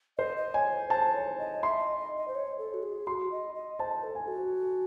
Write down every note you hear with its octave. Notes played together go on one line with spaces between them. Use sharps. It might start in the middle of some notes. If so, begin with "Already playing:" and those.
C5 D#5
D#5
C#5 G#5
C5
C5 A5
C#5
D#5
E5 C6
D#5
D#5
D#5
C5
C#5
A4
F#4
G#4
F#4 C6
D#5
D#5
C5 A5
A4
G#5
F#4